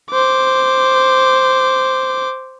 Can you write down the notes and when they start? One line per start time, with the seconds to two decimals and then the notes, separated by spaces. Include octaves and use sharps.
0.11 C5 D6